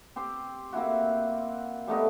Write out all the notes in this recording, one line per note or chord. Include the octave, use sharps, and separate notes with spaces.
C4 G4 C5
A#3 C4 E4 F#4
G3 A3 B3 D#4